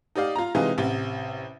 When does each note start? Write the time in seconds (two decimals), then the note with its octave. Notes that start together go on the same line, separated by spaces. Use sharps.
0.15 D#4 G4 D5 F5
0.36 F4 A#5
0.55 C3 E3 G#3 D#4 F4
0.78 A1 C3